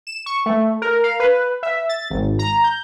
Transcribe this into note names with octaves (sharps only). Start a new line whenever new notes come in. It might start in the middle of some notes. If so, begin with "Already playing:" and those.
E7
C#6
A3
A#4
F5
B4
E5
A6
G#1
A#5
G6